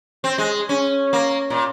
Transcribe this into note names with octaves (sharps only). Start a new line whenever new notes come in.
C4
G#3
C#4
A#3
A#2